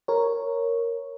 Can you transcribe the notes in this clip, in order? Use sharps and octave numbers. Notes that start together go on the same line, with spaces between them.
A#4 C#5